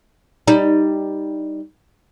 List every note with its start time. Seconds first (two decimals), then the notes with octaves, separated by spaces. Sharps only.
0.47 G3 D#4